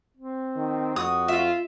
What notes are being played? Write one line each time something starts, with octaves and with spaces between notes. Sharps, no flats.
C4
D#3
F2 F#4 D#6
F4 E5